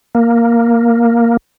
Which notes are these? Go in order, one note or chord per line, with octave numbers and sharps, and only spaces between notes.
A#3